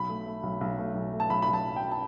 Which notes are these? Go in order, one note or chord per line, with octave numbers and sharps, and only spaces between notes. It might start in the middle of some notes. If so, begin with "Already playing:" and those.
Already playing: B1 B5
A3
A3
B1
B1
A3
B1
A3
A5
B1 B5
B5
B1
A5
B2
G5
A5